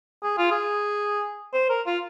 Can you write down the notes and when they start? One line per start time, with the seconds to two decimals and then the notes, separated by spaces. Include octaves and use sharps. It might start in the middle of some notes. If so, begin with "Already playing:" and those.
0.23 G#4
0.38 F4
0.51 G#4
1.54 C5
1.70 A#4
1.87 F4